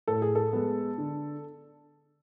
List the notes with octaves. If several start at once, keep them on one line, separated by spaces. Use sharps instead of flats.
A2 A4
G#4
A4
G#3 B3
D3